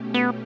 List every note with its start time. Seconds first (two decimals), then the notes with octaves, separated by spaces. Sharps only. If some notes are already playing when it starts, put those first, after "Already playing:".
Already playing: B2 A3 C#4 G4
0.14 B3